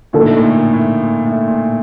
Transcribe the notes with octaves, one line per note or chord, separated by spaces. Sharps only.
A#2 D3 F3 A#3 D#4 A4
A2
A2
A#2
A2
A#2
A2
A#2